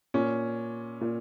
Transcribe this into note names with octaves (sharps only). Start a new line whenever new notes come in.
A#2 C#4
A#2